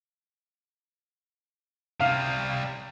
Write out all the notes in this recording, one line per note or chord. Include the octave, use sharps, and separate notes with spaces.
C3 G3 F5